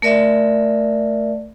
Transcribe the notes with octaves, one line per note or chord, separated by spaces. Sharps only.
A3 A#4 D5 E5